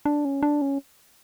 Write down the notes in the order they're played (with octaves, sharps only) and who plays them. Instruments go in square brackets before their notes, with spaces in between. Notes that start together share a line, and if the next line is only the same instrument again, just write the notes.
[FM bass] D4
C#4
D4
C#4